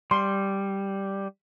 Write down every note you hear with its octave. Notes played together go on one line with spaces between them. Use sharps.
G3 C6